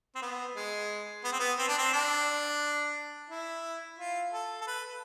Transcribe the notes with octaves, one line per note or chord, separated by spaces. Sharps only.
C4
B3
G#3
B3
C4
B3
C4
D4
C4
D4
E4
F4
A4
A4
B4